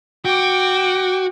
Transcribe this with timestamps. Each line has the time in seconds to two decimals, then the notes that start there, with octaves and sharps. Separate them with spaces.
0.25 F#4 G5 D6